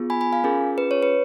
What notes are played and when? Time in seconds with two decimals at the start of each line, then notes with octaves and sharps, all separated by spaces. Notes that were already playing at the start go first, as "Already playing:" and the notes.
Already playing: B3 F4 G#4
0.10 G#5 B5
0.21 G#5 B5
0.33 F5 G#5
0.44 C#4 F4 G#4 A#4
0.78 B4
0.91 C#5
1.03 B4